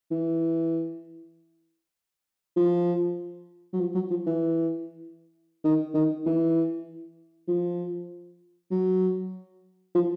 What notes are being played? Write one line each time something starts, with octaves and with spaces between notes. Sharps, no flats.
E3
F3
F#3
F3
F#3
F3
E3
D#3
D#3
E3
F3
F#3
F3